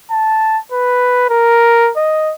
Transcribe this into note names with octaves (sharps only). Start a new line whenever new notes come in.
A5
B4
A#4
D#5